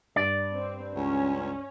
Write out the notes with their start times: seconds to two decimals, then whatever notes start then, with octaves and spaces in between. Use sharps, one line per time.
0.16 G2 D5
0.54 C4
0.95 C#2 C#4